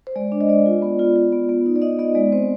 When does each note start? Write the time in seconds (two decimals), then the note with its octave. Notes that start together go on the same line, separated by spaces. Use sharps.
0.07 C5
0.16 G#3 D5
0.32 D4
0.41 D#5
0.49 G#3 D5
0.66 F4
0.82 B3
0.99 F4
1.16 F4
1.32 B3
1.49 B3
1.66 D#4
1.76 D5
1.82 D#4 D#5
1.99 B3 D#5
2.15 G#3 D5
2.32 C4 C5